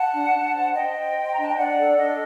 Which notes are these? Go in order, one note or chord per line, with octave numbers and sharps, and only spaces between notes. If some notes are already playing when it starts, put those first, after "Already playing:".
Already playing: F#5 A5
D4
D4
C5
C5 D#5 G5
C5
C5
C6
A#5
D4 A5
G5
D4 D5 F#5
A4
D4 D#5